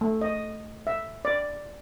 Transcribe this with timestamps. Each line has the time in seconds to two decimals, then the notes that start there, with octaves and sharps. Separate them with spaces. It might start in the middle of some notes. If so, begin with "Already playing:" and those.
0.01 A3
0.21 D#5
0.87 E5
1.25 D5